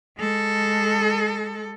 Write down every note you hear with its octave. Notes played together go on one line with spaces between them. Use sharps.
G#3 A4